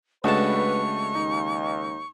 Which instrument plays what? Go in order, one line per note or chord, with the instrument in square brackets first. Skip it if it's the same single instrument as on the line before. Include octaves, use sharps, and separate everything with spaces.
[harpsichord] C#2 A5 [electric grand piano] A3 D4 F#4 [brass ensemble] B4 [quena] C#6
[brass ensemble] D#2 [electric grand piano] D#4